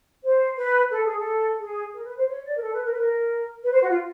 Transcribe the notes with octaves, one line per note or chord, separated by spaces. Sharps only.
C5
B4
A4
G#4
A4
G#4
A#4
B4
C5
C#5
D5
A#4
A4
B4
A#4
B4
A#4
B4
C5
F#4
F4